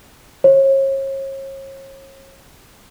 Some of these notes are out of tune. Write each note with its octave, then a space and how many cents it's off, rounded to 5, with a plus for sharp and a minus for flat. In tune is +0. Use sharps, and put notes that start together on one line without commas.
C#5 -40